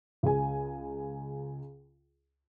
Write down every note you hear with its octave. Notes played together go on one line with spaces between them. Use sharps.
C#2 G#4 G#5